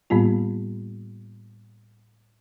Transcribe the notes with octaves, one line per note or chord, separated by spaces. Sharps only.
A2 G3 A#3 B3 F4